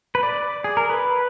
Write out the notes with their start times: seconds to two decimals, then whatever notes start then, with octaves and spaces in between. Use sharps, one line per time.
0.15 B4
0.23 D5
0.64 G#4
0.77 A#4
0.90 B4